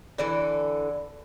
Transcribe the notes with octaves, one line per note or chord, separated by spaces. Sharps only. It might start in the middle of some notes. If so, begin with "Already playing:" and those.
D3 E3 A4